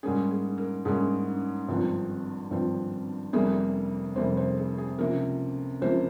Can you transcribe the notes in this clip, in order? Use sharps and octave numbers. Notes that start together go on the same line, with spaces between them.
G#2 G3 A#3 C#4 G#4
G#4
A#4
G#2 G3 A#3 C#4 G#4
G#1 G2 F3 C4
G#1 G2 F3 C4
F1 F2 C3 G3 A#3 G#4
F1 F2 C3 G3 A#3 C5
C5
G#4
G#4
C#2 C3 F3 A#3 A#4
C#2 C3 F3 A#3 C5